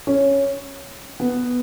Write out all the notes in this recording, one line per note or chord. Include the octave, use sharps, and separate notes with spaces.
C#4
B3